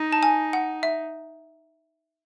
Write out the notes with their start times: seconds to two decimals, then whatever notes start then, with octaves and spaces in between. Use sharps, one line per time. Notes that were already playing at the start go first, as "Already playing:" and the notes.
Already playing: D#4
0.13 A5
0.23 G#5
0.53 F#5
0.83 E5